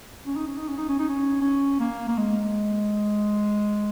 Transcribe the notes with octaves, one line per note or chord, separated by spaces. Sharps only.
C#4
D#4
C#4
D#4
C#4
D#4
C#4
D#4
C#4
C#4
A#3
A#3
G#3